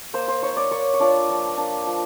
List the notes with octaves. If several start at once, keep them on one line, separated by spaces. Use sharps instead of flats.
A#3 C5
C5
D#4 C#5
D5
A#3 C#5
C#5
D4 F4 D5
F3
A#3 D4
F3